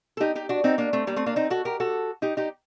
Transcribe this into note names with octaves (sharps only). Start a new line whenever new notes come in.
A4
D#4 G4
D#4 G4
D4 F#4
C4 D#4
A#3 D4
A3 C4
G3 A#3
A3 C4
A#3 D4
C4 D#4
F#4 A4
G4 A#4
F#4 A4
D#4 G4
D#4 G4